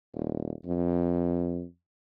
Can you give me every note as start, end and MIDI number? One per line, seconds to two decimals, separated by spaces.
0.14 0.52 27
0.66 1.64 41